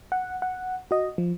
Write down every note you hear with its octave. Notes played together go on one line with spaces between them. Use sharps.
F#5
F#5
F#4 D#5
F3